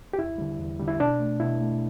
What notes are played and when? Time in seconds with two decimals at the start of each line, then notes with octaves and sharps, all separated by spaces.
0.13 G4
0.18 E2 E4
0.38 D3 G3
0.60 E2
0.80 D3 G3
0.88 E4
1.00 B2 D4
1.20 A3
1.40 B2 E4
1.61 A3